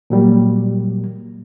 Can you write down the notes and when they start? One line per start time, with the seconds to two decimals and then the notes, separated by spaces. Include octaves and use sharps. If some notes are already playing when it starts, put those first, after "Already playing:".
0.10 A#2 F#3 G3 A#3